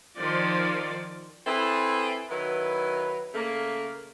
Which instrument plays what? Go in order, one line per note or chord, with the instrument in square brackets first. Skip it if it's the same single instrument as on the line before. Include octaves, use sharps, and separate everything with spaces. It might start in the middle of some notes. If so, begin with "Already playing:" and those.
[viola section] D#3 F3 D5
[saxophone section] C4 E4 G#4 A4 B4
D#3 F#3 E4 B4
C#3 A3 A#3